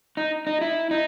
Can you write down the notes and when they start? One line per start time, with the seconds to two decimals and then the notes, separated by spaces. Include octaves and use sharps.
0.17 D#4
0.47 D#4
0.61 E4
0.91 D#4